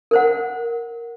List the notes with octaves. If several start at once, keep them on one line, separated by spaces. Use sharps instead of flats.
A#4 C5 F#5